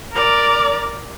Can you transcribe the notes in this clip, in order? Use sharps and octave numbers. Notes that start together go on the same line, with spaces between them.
A#4 D5